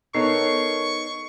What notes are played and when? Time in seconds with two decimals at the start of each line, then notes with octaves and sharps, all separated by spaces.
0.15 B3 D#4 A4 A#4 C#5 C#6 C7